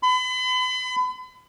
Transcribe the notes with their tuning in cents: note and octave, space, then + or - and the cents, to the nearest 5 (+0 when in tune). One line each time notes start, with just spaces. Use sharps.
B5 +40